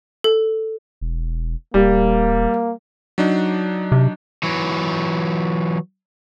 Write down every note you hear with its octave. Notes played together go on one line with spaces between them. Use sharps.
A4
E1
D#1 G3 A#3
F#3 D4 D#4
C3
E3 F#3